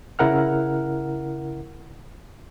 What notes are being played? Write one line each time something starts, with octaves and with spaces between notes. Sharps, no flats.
C#3 E4 A#4 F#5 F6